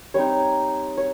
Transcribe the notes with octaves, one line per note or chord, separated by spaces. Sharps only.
G3 C4 D#4 C#5
C#5